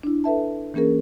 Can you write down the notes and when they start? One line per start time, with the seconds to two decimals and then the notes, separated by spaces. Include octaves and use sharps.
0.03 D4 E4
0.24 A4 B4 E5 A5
0.74 E3 A#3 C#4 G#4 A#4